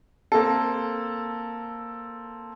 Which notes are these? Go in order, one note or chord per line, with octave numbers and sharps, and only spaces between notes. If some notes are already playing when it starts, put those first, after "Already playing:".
A#3 C4 A4